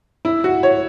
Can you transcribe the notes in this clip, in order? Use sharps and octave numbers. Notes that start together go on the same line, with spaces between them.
E4
F#4
C#5